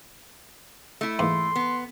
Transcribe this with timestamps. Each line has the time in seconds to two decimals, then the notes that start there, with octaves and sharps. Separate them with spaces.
1.01 A3 E4
1.19 E2 G#2 A#3 C6
1.56 B3